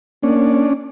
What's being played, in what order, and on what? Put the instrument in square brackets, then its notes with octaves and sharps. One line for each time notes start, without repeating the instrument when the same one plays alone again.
[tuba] A#3 [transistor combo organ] C#4 D4